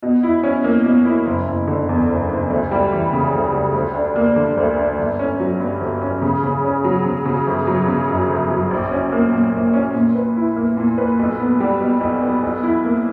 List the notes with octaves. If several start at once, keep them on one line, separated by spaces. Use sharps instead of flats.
B2
E4
C#4
A#3
B2
E4
F#1
F#1
D3
E2
F#1
F#1
D2
G3
E3
C#3
D2
G3
D2
D4
A#3
D3
D2
D4
G1
C#4
F#3
G2
G1
C#4
C#3
C#3
C#4
F#3
C#3
C#3
G1
F#3
C#3
F#2
G1
F#3
A#1
C#4
A#3
A#2
A#1
C#4
A#2
B4
E4
A#3
A#2
B4
B1
B3
G3
B2
B1
B3
B1
E4
A#3